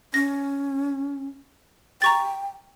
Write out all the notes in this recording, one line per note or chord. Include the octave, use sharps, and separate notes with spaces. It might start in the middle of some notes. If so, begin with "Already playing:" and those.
C#4 A#6
G5 A#5 C#6 A6